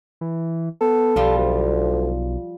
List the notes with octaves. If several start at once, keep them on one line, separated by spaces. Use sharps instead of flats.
E3
B3 A4
B1 F3 G3 F4
D2